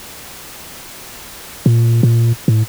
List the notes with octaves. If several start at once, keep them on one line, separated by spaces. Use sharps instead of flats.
A#2
A#2
A2